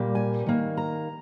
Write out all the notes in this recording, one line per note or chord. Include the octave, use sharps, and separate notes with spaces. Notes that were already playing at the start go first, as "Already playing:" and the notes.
Already playing: A#2 G3 A#3
G#5
D#3 A#3
A#5